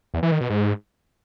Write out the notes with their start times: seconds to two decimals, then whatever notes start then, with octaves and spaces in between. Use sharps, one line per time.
0.14 E2
0.23 E3
0.32 D#3
0.41 B2
0.50 G#2